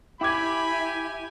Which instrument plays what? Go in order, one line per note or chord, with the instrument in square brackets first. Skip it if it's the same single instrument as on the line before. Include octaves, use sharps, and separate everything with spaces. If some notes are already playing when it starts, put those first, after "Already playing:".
[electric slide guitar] E4 [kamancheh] G4 G#5 [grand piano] G5 D6 G#6 [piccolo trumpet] B5